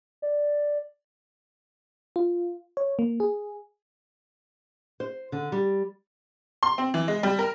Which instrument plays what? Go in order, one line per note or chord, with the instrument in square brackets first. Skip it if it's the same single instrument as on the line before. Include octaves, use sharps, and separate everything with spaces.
[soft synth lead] D5
[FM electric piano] F4
C#5
A#3
G#4
[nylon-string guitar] C5
D3
G3
[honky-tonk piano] C6
C4
E3
G#3
G3
A#4